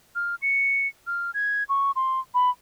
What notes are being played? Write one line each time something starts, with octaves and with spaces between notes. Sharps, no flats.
F6
C#7
F6
G#6
C#6
C6
B5